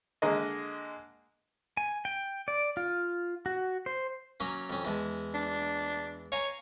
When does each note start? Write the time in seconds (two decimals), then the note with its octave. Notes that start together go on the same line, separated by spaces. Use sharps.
0.22 D3 G#3 A#3 D#5
1.77 G#5
2.05 G5
2.48 D5
2.77 F4
3.46 F#4
3.86 C5
4.40 F#3 A#3 C#4
4.70 F2 C#4
4.85 E2 G#3 A5
5.34 D4
6.32 C#5 F5 G#5 A#5